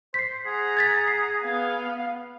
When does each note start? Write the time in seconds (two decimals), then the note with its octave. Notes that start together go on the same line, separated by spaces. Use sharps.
0.14 C5 B6 C7
0.46 G#4 F#5 A#5
0.77 G#6 A6 B6
1.08 C7
1.43 B3 F5